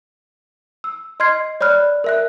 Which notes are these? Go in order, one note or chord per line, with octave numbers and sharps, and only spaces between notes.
E6
D#5 C6 F6 G#6 C7
C#5 D5 B5 F6 F#6
A#4 E5 F#6